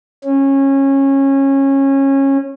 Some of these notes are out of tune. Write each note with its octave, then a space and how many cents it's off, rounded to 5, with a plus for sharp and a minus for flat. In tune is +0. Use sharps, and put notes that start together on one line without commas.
C#4 -20